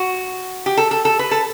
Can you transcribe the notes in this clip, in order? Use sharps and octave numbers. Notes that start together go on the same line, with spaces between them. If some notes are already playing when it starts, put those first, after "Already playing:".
Already playing: F#4
G4
A4
A4
A4
B4
A4